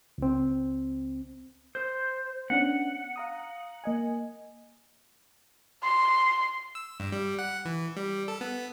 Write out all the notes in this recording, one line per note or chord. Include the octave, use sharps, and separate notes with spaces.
C#2 C4
C5 G6
B3 C#4 D4 F#5
F5 A#5 D#6
A#3 D#5 G#5
C6
E6
G2
G3
F#5
E3
G3
A4
B3